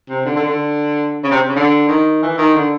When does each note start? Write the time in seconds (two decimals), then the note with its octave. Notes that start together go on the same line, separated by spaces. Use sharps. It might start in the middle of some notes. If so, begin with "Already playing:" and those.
0.09 C3
0.25 D3
0.36 D3
0.47 D3
1.24 C#3
1.31 C3
1.48 C#3
1.56 D3
1.89 D#3
2.22 E3
2.38 D#3
2.55 D3